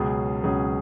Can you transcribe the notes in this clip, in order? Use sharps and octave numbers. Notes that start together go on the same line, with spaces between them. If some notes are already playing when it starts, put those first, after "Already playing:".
Already playing: C#2 B2 F#3 C#4 G#4
C#2 B2 F#3 C#4 G#4